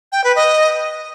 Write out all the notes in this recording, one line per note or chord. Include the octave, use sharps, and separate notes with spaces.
G5
B4
D#5